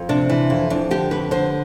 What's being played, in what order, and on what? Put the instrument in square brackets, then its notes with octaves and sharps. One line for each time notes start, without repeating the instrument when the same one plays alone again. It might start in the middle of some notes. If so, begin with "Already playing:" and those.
Already playing: [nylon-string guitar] F2
C3 D4
E3
F2
F2 D4
D3 G4
F2 B4
D3 C5